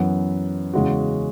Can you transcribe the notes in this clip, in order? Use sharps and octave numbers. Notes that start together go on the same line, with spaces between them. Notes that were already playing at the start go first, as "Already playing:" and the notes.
Already playing: F#2 E3 B3
E2 C#3 G#3 C#4 F#4